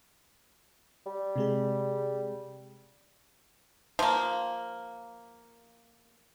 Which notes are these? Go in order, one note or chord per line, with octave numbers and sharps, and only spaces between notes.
G3
C3 G#3 G#4
F3 A#3